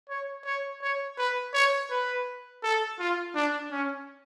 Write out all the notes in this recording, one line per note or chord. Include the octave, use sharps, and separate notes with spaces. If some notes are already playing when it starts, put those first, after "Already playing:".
C#5
C#5
C#5
B4
C#5
B4
A4
F4
D4
C#4